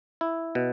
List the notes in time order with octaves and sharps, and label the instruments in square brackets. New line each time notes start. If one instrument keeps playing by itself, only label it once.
[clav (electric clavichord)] E4
B2